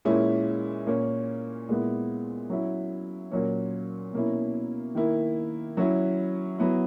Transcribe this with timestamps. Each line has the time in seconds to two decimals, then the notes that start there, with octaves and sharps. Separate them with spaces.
0.05 A#2 G#3 C#4 E4
0.86 A#2 A#3 C#4
1.69 A#2 G#3 B3 E4
2.50 F#3 C#4 E4
3.32 A#2 F#3 C#4
4.13 B2 A#3 C#4 E4
4.95 D#3 A#3 E4
5.77 F#3 C#4 E4
6.59 F#3 B3 E4